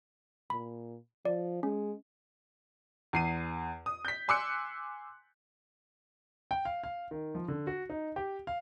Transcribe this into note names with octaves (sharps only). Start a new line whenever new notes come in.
A#2 B5
F3 D5
G#3 C#4
E2 C7 D#7
D#6
G6 B6
G#5 C6 D6 E6 F#6 C#7
G5
F5
F5
D#3
F3
D3
F#4
D#4
G4
F5